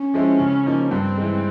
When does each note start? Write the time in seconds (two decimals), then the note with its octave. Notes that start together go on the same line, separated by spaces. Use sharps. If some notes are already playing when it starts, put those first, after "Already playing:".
Already playing: C#4
0.14 F3 G#3 C4 E4
0.39 C#3
0.66 F3 A#3 D#4
0.91 G2 C4
1.18 E3 G#3